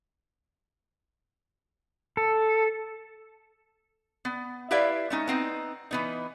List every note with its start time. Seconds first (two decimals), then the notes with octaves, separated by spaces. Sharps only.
2.17 A4
4.25 B3
4.71 E4 G4 B4 D5 E5 F5
5.10 A3 C#4 D#4
5.27 B3 C4 D#4
5.91 E3 B3 D#4